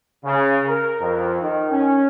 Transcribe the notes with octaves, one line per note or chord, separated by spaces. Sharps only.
C#3
A#4
F2
D#3
C#4